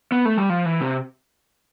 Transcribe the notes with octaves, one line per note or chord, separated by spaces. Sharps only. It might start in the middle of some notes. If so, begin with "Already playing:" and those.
B3
A3
G3
F3
E3
C3